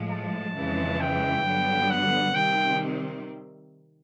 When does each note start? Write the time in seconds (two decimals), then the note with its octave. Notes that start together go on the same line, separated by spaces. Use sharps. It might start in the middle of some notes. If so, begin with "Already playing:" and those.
Already playing: A2 F3 G#3
0.11 A5
0.56 F2 C#3 E3 G#3
1.01 G5
1.45 G2 D3 F#3 B3
1.91 F#5
2.35 C3 D#3 G3 C4 G5